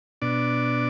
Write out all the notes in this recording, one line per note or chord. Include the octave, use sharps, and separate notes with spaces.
B2 D4 D5